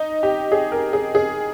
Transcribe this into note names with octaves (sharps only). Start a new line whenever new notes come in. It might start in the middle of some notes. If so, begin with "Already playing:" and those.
Already playing: D#4
G4
G#4
A#4
G#4
G#4